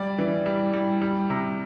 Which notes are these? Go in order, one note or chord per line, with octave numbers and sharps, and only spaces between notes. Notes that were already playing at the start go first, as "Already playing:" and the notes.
Already playing: G3 D5
E3
G3
G3
G3
C3